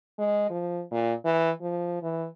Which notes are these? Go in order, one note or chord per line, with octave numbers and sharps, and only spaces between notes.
G#3
F3
A#2
E3
F3
E3